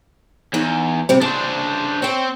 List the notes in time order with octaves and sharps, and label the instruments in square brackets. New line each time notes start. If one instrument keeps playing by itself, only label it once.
[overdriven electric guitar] E2 [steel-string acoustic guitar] D#4
[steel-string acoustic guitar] C3 G3 C4
[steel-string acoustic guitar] C#3 [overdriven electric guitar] D4 C5
[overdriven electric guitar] C4 [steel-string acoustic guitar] C#5 G5